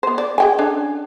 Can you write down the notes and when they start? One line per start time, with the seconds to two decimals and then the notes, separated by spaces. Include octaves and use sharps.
0.03 B3 C5
0.18 D5
0.38 G#4 G5 G#5
0.59 C#4 D4 A4